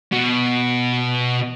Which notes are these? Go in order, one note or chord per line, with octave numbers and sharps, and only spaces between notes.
B2 F#4